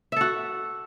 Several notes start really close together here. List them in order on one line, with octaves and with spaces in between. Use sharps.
E5 A4 F#4